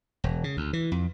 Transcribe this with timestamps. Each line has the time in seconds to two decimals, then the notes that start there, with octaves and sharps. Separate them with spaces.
0.24 E1
0.44 C#3
0.57 D2
0.73 E3
0.92 F2